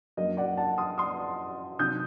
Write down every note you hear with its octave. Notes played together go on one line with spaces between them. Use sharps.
F#2 F#3 A#3 D4 D#5
D5 F#5
F#5 A5
C6 D#6
C6 D#6
C3 D#3 F#3 D#6 G6